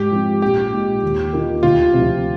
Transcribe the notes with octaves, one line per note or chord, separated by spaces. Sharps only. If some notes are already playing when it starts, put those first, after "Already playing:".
Already playing: G#2 G4
F3 C4
A#1 G4
A#2 G#3 D#4
D#2
D#3 A#3 F4 A#4
D2 F4
C3 F3